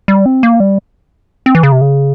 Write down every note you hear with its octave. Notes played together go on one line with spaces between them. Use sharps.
G3
C4
A#3
G3
C4
E3
C#3
C3
C#3